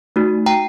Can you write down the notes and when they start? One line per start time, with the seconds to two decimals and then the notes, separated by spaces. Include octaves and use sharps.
0.16 A3 D#4 F#4
0.46 G5 A#5